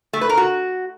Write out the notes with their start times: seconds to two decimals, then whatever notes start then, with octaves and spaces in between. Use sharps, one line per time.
0.13 A3
0.21 B4
0.29 A#4
0.37 F#4